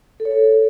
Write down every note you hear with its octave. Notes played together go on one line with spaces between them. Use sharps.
A4
C#5
A4